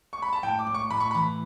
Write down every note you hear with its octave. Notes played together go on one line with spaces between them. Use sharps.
C#6
B5
A5
A2 G5
D6
A2
C#6
A2 B5
C#6
B5
E3